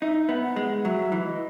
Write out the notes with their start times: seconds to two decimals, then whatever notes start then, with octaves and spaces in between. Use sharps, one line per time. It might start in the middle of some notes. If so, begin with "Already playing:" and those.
0.01 D#4 E5
0.14 D#5
0.25 B3 E5
0.42 F#5
0.56 G#3
0.84 F#3 E5
1.12 E3
1.25 D#5